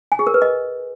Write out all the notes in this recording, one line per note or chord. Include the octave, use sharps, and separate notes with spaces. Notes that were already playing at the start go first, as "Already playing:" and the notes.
G#5
G#4
A#4
B4
D#5